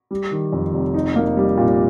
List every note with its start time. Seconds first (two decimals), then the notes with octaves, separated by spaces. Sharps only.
0.11 G3
0.31 D#3
0.53 F2
0.73 F1
0.94 D#4
1.16 A#3
1.37 G3
1.58 A#2